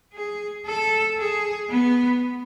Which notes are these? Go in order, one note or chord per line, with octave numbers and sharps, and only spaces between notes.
G#4
A4
G#4
B3